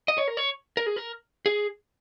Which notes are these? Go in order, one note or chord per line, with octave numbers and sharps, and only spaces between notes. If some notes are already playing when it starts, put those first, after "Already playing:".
D#5
C#5
A#4
C#5
A#4
G#4
A#4
G#4